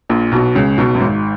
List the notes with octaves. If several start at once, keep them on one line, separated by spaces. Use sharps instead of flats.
A#1 A#2
B1 B2
C#2 C#3
B1 B2
F#2
G#1 G#2